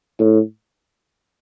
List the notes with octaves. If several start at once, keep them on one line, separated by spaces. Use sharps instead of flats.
A2